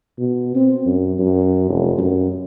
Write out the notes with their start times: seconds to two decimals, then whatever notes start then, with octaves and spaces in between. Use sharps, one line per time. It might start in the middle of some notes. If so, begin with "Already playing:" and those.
0.19 B2
0.56 C4
0.86 F#2
1.19 F#2
1.70 F1
1.98 F#2